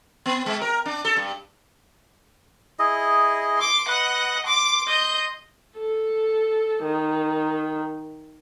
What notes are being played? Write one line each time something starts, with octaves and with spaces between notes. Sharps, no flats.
B3
G#3
A#4
D4
A4
G2
E4 G#4 D#5
C6 D6
B4 D#5 F#5
C6 D6
D#5 G6
A4
D#3